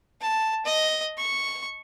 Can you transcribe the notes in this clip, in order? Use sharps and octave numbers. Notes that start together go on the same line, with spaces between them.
A5
D#5
C#6